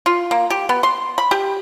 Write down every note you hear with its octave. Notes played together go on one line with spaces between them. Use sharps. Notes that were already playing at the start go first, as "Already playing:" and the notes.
F4
A#3
G4
B3
C6
B5
G4